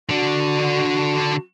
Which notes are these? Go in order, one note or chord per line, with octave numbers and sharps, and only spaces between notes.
D3 D4 F#4